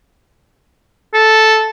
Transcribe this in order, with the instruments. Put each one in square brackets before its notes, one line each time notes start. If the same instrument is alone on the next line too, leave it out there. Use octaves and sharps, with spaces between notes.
[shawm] A4